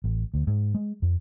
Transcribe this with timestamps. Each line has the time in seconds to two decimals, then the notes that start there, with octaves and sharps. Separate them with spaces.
0.04 A1
0.34 D2
0.47 G#2
0.74 G#3
1.02 F2